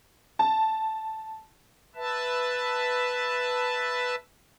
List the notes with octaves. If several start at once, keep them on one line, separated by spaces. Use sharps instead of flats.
A5
B4 E5 A5